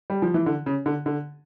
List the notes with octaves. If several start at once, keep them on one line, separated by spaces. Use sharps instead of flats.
G3
F3
E3
D3
C#3
D3
D3